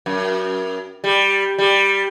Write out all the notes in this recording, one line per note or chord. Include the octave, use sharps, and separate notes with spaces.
F#2
G3
G3